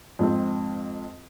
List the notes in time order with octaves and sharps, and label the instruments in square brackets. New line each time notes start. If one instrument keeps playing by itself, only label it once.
[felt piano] F2 G#2 C4